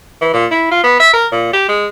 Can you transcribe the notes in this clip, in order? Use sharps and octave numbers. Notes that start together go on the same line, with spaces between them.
E3
A#2
E4
F4
B3
E5
A#4
A#2
G4
G#3